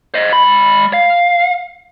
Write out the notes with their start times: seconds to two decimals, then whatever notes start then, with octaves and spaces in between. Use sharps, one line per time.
0.14 C5 D#5
0.33 G#3 B5
0.93 F5